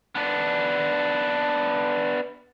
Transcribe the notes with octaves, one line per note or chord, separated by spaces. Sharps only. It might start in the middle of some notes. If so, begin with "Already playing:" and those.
B3 D4